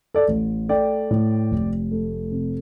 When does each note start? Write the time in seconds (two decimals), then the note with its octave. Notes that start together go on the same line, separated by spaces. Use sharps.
0.14 A4 D5
0.28 A1
0.69 A3 D5 G5
1.11 A2
1.51 F1
1.92 A3
2.32 C3